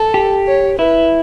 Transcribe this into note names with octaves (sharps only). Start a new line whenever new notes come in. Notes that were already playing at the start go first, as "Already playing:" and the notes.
Already playing: A4
G4
C#5
E4 B4